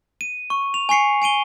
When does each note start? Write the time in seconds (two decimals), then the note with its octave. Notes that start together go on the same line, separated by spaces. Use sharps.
0.21 D#7
0.50 C#6
0.74 F7
0.89 G#5 C#6 C7 C#7
1.22 G#5 D7 D#7 G7